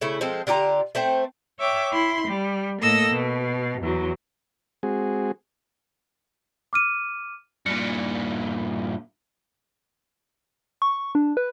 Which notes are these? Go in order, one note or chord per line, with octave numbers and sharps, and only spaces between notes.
C#3 A3 E4
F3 G#3 C4 A4
D3 F4 G4 A#5
A3 C4 C5 G5
C#5 E5 G5 D6
E4 B5 C6
G3
A2 A#3 A4 D#5 E6 A#6
B2
E2 F#3
G#3 C4 F#4 G#4
D6 F6 D#7
G2 A#2 C#7
C#6
D4
B4